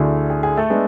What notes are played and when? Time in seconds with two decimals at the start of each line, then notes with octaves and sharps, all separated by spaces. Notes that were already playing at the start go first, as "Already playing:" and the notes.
Already playing: D2 D3 A3 E4 G#4
0.30 G#4
0.43 G#4
0.57 A3 A4
0.70 G#3 B3 D4